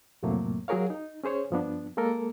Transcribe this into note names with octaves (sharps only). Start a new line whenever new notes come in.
F2 A2 C3 F#3 A3 A#3
F#3 F#4 G#4 A#4 C#5 F5
D#4
C#4 G#4 C5 C#5
G2 F3 B3 D4
G#3 A#3 A4 A#4